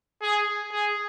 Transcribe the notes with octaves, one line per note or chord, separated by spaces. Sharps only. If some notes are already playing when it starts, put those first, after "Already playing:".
G#4
G#4